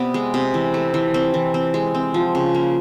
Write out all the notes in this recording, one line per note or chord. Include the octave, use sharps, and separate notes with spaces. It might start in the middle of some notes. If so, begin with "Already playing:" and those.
Already playing: C3 B3 D5
G#3
C3
E3
A3
E3
C4
E3
C4
G#3
C4
F3
C#3
A#3